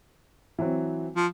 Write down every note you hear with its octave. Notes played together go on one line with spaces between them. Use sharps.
E3 F#3 C4
F3